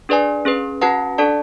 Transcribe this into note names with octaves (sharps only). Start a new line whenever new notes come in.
D4 G#4 B4 D5 G#5
C#4 G#4 B4
C#4 F#4 B4 F#5 A5
D4 A4 D5 A5